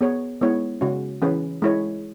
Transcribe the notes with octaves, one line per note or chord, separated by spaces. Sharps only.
B3 G#4 C#5
G#3 B3 E4 C#5
C#3 G#3 C#4 F#4
E3 C#4 G#4 B4
G#3 E4 C#5